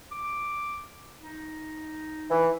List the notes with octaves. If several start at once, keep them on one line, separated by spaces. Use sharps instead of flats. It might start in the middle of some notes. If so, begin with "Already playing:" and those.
D6
D#4
E3